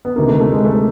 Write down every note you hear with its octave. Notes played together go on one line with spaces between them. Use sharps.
B3
D2 C3 D#3 A#3
A3
A3
G#3
A3